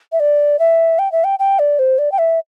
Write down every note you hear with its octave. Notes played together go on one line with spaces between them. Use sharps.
E5
D5
E5
G5
E5
G5
G5
D5
C5
D5
G5
E5